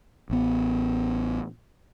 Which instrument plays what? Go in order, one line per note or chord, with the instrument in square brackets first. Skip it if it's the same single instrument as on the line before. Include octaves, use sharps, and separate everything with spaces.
[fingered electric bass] A1 B3